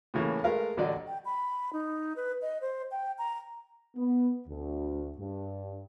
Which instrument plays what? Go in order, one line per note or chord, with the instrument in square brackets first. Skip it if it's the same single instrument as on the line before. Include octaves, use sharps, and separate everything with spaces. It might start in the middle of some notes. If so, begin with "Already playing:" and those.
[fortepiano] A2 C#3 E3 A3 A#3 C#4
G#3 A3 A#4 B4 F5
A1 D3 F#3 D5 D#5
[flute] G5
B5
D#4
B4
D#5
C5
G5
A#5
[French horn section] B3
D2
G2